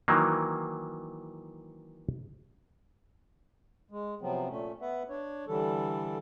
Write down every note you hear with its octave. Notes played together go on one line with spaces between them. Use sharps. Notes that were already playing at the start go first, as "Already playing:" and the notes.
D#3 E3 F#3 A#3
G#3
C3 F3 F#3 B3 C4
A#2 A3 C#4
B3 B4 E5 F#5
D4 C#5
D3 E3 G3 A4